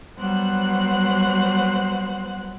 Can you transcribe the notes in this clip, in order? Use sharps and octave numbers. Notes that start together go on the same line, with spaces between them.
F#3 G3 B3 C5 F#5 F#6